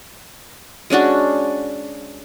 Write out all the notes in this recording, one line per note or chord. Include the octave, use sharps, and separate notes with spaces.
G#3 C#4 D4 F#4